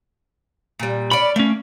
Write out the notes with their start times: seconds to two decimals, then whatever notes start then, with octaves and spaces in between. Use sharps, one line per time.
0.80 A#2 G3
1.11 C#4 D5 B5
1.36 A3 A#3 C#4